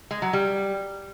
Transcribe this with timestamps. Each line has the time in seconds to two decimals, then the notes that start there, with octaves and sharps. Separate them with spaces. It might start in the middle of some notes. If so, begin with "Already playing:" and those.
0.11 G#3
0.22 F#3
0.33 G3